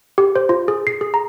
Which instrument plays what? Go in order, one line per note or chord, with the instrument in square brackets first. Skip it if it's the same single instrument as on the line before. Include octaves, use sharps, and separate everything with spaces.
[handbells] G4
C5
F4
G#4
C7
G#4
A#5